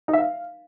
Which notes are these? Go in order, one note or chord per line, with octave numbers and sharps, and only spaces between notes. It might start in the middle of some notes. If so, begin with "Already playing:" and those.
D#4
E5
F5